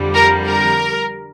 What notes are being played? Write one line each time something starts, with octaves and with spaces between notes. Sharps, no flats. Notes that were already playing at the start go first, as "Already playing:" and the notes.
Already playing: F2 D3 G3
A#4
A#4